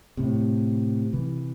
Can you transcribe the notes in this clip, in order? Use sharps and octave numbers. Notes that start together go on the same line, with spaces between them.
A2 C3
C3 E3